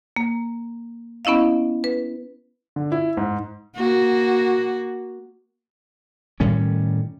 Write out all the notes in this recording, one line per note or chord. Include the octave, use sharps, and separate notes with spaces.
A#3
B3 C#4 E4 D#5 F5
B4
D3
E4
G#2
A#3 F#4
A2 D#3 G3 C#4